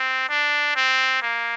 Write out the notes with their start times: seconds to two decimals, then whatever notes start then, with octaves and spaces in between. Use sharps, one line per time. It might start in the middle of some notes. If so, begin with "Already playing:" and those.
Already playing: C4
0.29 D4
0.76 C4
1.22 A#3